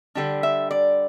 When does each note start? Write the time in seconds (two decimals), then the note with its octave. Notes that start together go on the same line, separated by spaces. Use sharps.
0.15 D3 G3 D4
0.43 E5
0.71 D5